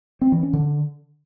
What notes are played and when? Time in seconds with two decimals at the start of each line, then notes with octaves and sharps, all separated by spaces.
0.21 C4
0.32 E3
0.43 C#4
0.53 D3